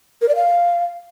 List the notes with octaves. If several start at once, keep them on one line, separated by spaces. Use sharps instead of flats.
A#4
D5
F5